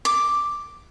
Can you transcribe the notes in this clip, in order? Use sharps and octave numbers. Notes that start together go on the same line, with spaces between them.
D6